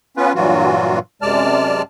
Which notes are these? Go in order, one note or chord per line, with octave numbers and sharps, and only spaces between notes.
B3 C#4 F4 B4
G2 A#2 E3 F#3 F4 F#4
F#2 C3 G#3 D5 A5 F6